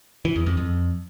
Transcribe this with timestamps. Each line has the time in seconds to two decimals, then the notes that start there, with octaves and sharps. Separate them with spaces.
0.25 E3
0.36 E2
0.46 F2
0.57 F2